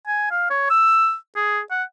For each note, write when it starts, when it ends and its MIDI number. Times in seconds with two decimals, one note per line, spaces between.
0.07 0.26 80
0.31 0.50 77
0.50 0.67 73
0.70 1.15 88
1.36 1.60 68
1.71 1.83 78